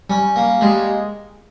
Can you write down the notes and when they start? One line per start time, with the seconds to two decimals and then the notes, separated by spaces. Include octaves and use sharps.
0.09 G3 C#4
0.36 A#3
0.61 G3 G#3